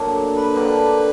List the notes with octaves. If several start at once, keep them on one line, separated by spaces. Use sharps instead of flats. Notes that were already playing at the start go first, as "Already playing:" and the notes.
Already playing: D3 F#3 A#3 D4
B4
D3 G3 A#3 D4